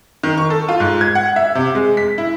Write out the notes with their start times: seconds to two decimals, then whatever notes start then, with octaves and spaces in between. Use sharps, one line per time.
0.23 D#3
0.37 C#6
0.50 A4
0.68 F4
0.80 G#2
1.01 G#6
1.15 F#5
1.36 E5
1.55 C3
1.75 G#3
1.97 B6
2.18 E4